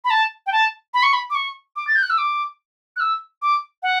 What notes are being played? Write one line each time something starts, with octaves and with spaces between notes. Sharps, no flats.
B5
A5
G5
A5
B5
C#6
B5
D6
C#6
D6
A6
G6
F#6
E6
D6
F#6
E6
D6
F#5